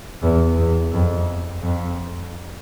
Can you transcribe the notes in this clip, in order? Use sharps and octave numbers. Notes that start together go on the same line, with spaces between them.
E2
E2
F2
F2